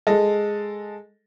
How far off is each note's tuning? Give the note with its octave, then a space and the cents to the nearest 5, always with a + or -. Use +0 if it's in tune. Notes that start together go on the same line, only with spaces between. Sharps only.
G#3 +0 A4 +0 D#5 +0